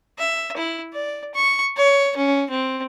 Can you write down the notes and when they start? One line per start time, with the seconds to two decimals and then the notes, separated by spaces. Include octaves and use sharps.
0.18 E5
0.56 E4
0.93 D5
1.34 C#6
1.77 C#5
2.16 C#4
2.50 C4